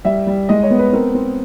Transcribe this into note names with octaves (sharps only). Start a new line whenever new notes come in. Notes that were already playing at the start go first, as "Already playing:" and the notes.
G3 E5
G3
G#3 D#5
C#5
B3
B4
C4 A#4
C4